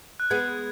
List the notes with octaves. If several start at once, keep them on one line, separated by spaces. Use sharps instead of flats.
F#6
G#3 B3 G#6